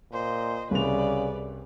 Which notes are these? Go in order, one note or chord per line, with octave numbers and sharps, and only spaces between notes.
A#2 C5 D#5
C2 C#3 B4 D5 F7